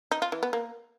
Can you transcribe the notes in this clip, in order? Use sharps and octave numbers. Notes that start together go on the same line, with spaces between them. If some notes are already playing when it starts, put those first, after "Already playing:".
D#4
F4
E3
B3
A#3